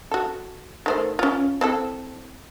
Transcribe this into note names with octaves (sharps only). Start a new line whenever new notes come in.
F#4 A4
D#3 A3 C5
C#4 F4
C4 E4 A4